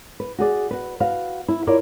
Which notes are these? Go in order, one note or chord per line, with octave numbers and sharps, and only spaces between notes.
B4
F#4 G#4 D5
F#4 B4
F#4 B4 F5
E4
E4 F4 A#4 C#5 D5 F5